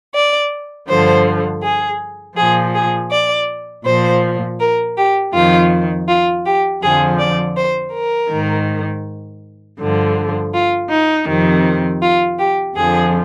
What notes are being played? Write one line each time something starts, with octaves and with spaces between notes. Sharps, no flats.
D5
G2 D3 F3 C5
G#4
A#2 F3 G#4
G#4
D5
A#2 F3 C5
A#4
G4
F2 D#3 F4
F4
G4
F2 D3 F3 G#4
D5
C5
A#4
G#2 D#3
G2 D3 F3
F4
D#4
F2 C3 D#3
F4
G4
F2 D3 F3 G#4